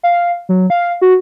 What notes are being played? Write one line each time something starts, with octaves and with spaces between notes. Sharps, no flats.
F5
F#3
F5
F#4